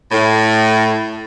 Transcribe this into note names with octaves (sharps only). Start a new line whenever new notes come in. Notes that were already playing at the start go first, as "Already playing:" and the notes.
A2